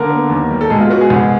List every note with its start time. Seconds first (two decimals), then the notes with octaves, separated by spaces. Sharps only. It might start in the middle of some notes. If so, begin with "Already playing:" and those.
Already playing: D3 A#3 A#4
0.10 B3
0.30 D#2
0.51 G3
0.61 A4
0.70 B2 G#3 G#4
0.80 F4
0.90 B3 F#4
1.01 G#3 G#4
1.10 C2